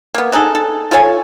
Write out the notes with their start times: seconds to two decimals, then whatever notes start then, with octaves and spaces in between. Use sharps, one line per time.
0.14 A#3 B3
0.32 D4 D#4 G#4 A4
0.55 A4
0.91 F4 A4 C#5 G#5